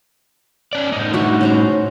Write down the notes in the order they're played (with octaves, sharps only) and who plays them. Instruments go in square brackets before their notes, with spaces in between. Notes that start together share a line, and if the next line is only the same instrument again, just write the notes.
[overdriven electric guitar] C#4 D5
A2 D#4
[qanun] D4 F#4 E5
C#4 C5 A#5